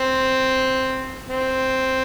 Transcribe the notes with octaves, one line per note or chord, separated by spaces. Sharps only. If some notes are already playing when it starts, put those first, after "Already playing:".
Already playing: C4
C4